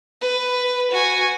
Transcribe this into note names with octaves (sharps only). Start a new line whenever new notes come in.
B4
F#4 G#5